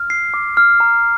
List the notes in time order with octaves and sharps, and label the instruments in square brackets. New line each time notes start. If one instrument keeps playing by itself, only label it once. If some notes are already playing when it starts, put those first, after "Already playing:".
Already playing: [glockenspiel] F6
C7
D6
F6
A#5